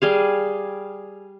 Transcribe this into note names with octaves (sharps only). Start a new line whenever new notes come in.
G3 G#4 F5